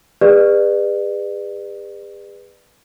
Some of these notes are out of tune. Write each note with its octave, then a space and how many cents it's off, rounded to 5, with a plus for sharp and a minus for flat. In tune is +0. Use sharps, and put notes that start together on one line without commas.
G#4 -40 B4 +0 D5 +30